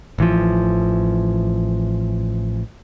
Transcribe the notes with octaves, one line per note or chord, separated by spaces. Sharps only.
A1 E3 F3